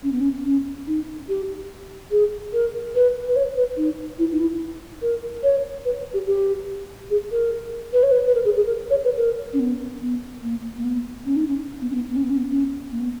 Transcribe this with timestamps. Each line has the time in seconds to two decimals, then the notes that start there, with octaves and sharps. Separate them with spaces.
0.03 C#4
0.12 B3
0.21 C#4
0.44 C#4
0.87 D#4
1.29 G4
2.11 G#4
2.53 A#4
2.95 B4
3.28 B4
3.36 C#5
3.57 B4
3.77 D#4
4.19 E4
4.32 D#4
4.40 E4
5.02 A#4
5.43 C#5
5.85 B4
6.14 G4
6.27 G4
7.10 G#4
7.31 A#4
7.93 B4
8.03 C#5
8.12 B4
8.27 B4
8.35 A#4
8.45 G#4
8.56 G#4
8.66 A#4
8.90 C#5
9.04 B4
9.17 A#4
9.53 C#4
9.60 B3
10.01 B3
10.43 A#3
10.77 A#3
10.85 B3
11.26 C#4
11.36 D#4
11.47 C#4
11.81 B3
11.91 C#4
11.95 B3
12.09 B3
12.16 C#4
12.23 B3
12.31 C#4
12.37 B3
12.51 C#4
12.92 A#3
13.01 B3